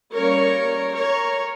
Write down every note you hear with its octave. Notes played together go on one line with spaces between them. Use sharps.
G3 A#3 C#4 A#4 C#5
A#4 C#5